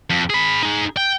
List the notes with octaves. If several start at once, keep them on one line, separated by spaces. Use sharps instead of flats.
F2
G#4 B5
D#4 G#4
G5